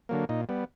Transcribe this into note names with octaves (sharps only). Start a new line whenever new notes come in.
D3 F#3 A#3
A#2 D#4
G3 B3